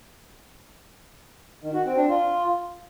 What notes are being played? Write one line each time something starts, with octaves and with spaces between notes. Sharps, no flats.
D#3
F#4
C4
D4
F4